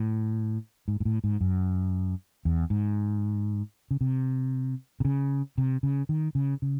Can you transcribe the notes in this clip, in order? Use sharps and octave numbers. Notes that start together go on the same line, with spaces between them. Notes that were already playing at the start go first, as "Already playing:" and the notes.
Already playing: A2
G#2
G#2
A2
G#2
F#2
E2
G#2
C#3
C3
C3
C#3
C3
C#3
D#3
C#3
C#3